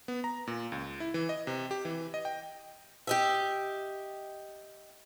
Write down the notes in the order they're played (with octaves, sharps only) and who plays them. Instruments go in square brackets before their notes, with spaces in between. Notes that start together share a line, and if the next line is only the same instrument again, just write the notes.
[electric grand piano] B3
A#5
A#2
C#2
E4
E3
D#5
C3
G4
E3
D#5
G5
[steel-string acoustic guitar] G4 D#5 E5